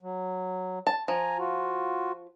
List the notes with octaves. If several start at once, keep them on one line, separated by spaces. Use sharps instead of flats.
F#3
A5
F3 G#5 A#5
F4 F#4